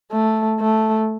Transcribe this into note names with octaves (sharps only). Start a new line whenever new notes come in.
A3
A3